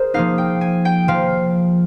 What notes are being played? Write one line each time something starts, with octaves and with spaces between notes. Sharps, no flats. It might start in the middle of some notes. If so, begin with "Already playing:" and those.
Already playing: G#4 A#4 C5
F3 A#3 D#4 F5
G5
G#5
G5
F3 F5